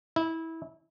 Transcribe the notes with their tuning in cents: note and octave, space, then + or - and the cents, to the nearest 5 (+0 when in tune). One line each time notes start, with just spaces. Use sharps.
E4 -20